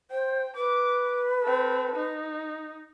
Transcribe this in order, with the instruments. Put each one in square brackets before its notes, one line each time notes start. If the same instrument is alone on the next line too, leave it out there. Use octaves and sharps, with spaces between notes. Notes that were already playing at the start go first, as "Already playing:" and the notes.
[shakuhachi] C5 [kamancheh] G5
[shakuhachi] B4 [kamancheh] D6
[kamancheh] C4 A4
D#4